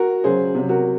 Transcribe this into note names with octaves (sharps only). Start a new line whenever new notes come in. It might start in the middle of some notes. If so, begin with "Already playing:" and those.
Already playing: F#4 A#4
C#3 F#3 G#4 C5
C3 F#3
F#4 A#4